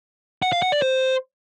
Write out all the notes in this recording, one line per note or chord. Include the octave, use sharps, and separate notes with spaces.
F#5
F5
F#5
D5
C5